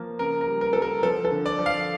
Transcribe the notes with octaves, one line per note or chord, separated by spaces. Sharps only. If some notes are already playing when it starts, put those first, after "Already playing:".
Already playing: F3 A#3
C#3 A#4
A#4
G3
A#4
G3 A4
A#4
F3 A4
A4
D3
D5
F3
F5